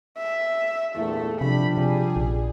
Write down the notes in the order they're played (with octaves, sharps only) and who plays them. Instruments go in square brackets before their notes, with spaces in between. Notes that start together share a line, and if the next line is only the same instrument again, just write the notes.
[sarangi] E5
[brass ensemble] E2 G2 A#2 [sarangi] A3
[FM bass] C3 [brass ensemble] F3 G3 D4 [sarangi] B5
[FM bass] C3 [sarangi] G#4
[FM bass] A#1